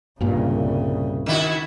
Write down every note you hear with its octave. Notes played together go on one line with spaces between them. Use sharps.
C2 G2 A#2 C#3
D#3 E4 F#4